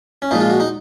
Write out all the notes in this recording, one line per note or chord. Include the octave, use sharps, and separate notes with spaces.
C#4
A#2 F3 G#3 D#4
F4
F#4
D#4